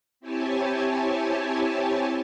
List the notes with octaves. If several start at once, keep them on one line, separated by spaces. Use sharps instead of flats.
C4 E4 G4 C#5 G#5 A5